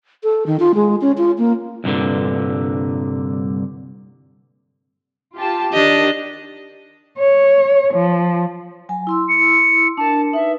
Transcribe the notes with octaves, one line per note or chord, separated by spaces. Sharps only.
A4
D#3
F4
G#3
C#4
F4
A#3
C2 G2 A#2 D3
F4 G4 A5
D#3 D4 G4 D#5
C#5
F3
F#3 G#5
E4 C6 E6
C#7
D4 A#4 A5
D#4 B4 E5